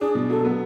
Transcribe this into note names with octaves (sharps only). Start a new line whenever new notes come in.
D4 G#4
B2
F#3 A4
B3